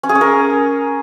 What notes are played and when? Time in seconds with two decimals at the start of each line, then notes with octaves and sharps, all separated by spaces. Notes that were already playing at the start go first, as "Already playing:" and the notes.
0.03 C#4
0.09 G#4
0.15 C#4
0.21 A#4